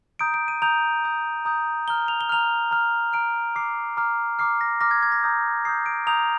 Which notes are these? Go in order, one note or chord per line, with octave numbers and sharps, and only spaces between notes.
A#5 D#6 G6 D7
D7
D#7
A#5 D#6 G6 F7
A#5 D#6 G6
A#5 D#6 G6
A#5 F6 G7
F7
G7
A#5 F6 F7
A#5 F6
A#5 F6 D7
A#5 D6 F6 C7
A#5 D6 F6
A#5 D6 F6 C7
A#6
A#5 D6 F6 A#6
G#6
G#6
A#6
A#5 D#6 G6
A#5 D#6 G6 C7
D7
A#5 D#6 G6 F7